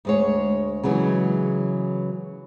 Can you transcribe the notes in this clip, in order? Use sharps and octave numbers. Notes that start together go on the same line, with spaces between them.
D2 G#3 C#5
C#3 E3 F#3 G#3